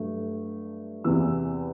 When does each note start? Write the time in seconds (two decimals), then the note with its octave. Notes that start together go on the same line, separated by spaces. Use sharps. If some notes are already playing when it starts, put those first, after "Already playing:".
Already playing: G2 F#3 A3
1.04 E2 C3 E3 E6